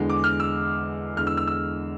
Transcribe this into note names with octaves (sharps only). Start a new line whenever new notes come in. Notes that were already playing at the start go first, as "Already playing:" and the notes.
Already playing: E2 D3 G#3
D6
F6
E6
E2 D3 G#3 F6
E6
E6
E6